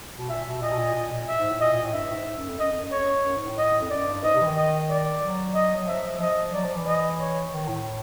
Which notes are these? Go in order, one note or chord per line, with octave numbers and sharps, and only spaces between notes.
B2
A#2 E5
B2
A#2 D#5
B2
A#2
A#2
A#2
E5
G#2
A2
A#2 D#5
A#2
A2
G2 E5
A2
G#2
G#2
F#2
F2
F#2 D#5
F2
F#2
F2 C#5
F#2
F#2
G#2
A2
D#5
F2
F#2 D5
G2
G#2 D#5
C3
E3
D#3
D#5
D5
F#3
D#5
F#3
F3 E5
F3 D#5
F#3 D5
F3
E3
D#5
C#5
D#3
A2